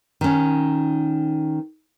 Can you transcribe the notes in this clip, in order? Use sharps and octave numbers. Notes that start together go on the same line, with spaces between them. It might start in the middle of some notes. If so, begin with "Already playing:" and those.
D#3 C#4